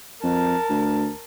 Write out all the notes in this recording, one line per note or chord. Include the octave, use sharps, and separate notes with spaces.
F2 A#4 A5
D2